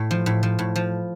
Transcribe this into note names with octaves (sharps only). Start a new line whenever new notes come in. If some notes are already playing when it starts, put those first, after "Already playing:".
Already playing: A2
F3
A2
F3
A2
F3